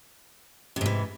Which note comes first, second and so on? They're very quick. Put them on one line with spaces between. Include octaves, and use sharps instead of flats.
C3 G#2 E3